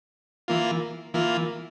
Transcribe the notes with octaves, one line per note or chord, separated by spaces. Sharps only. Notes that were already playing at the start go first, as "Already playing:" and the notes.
E3 A#3 F4
E3 A#3 F4